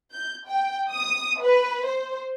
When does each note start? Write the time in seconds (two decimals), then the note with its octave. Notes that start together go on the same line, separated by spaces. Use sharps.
0.12 G6
0.48 G5
0.90 D#6
1.41 B4
1.86 C5